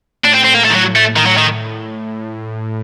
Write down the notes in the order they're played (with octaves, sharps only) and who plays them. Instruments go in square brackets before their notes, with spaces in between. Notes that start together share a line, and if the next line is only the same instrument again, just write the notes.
[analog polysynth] A2 [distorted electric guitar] D4
[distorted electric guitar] C4
C4
A#3
A3
D#3
F#3
A3
D#3
F#3
D#3